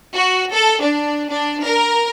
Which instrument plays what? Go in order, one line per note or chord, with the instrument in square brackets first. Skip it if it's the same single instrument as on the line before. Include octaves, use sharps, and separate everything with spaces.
[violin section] F#4
A4
D4
D4
A#4